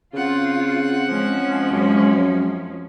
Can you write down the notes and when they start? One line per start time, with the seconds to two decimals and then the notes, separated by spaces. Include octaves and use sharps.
0.14 C#3 C4 F4 F#5
1.07 F3 G#3 C#4
1.71 F#2